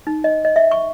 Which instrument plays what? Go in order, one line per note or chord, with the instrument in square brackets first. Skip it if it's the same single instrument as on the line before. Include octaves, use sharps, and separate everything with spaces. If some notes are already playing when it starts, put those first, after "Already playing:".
[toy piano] D#4
D#5
D#5
E5
C#6